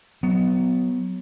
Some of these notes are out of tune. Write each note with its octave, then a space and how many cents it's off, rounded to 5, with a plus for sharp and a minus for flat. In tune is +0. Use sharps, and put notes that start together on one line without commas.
F#3 +0 B3 +15